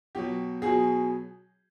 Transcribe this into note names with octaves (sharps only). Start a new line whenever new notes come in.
B2 F#3 G4
B2 F#3 G#4